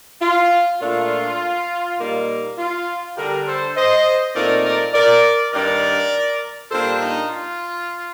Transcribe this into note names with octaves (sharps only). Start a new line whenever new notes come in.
F4
A#2 A3 D4 F4
A#2 G3 A#3 D#4
F4
D3 G3 D4 G4 A#4
A4 C5
C5 D#5
A#2 A3 C4 D#4 A#4 D5
A#4 D5
A#4 D5
G2 D#3 G3 D4 A#4 D5
A#2 G3 A#3 D4 A4 C5
D#4
F4